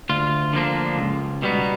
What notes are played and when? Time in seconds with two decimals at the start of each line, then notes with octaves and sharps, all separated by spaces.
0.09 D2 F4
0.53 D3 F3 A#3 D4
0.98 C#2
1.42 B2 G3 B3 D#4